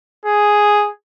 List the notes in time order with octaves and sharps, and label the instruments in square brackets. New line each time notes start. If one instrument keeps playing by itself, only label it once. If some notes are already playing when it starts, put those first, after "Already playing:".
[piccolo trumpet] G#4